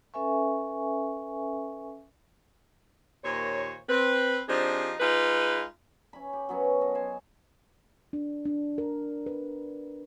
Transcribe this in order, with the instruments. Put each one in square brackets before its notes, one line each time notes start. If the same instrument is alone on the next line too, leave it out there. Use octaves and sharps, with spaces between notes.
[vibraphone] C#4 A4 B4 E5 G#5 C#6
[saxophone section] D#2 A#2 C5 C#5
C4 B4
F3 C4 D4 D#4 G4 G#4
G#3 D#4 F4 G#4 B4
[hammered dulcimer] C#4 E5 B5
G4
F#3 B3 C#4 A#4
A4 D#5
C5 G#5
[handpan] D4
D4
A#4
B4